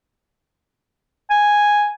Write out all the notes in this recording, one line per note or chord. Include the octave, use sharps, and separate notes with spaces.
G#5